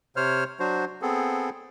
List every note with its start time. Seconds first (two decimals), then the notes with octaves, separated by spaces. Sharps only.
0.16 C3 C5 C#5 F6
0.60 F#3 D4 F#4 C5
1.02 B3 C4 G#4 A4